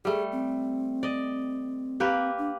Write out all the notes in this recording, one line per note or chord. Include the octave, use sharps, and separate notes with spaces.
G3 A3 G#4
C4
D5 D#5
A#3 G4 B4
D4